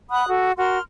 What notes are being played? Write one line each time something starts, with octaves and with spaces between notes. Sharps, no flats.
F#5 B5 D#6 F#6
F#4 A4
F#4 A#4 C6 F6